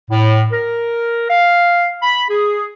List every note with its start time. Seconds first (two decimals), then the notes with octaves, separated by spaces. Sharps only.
0.10 A2
0.51 A#4
1.30 F5
2.02 B5
2.29 G#4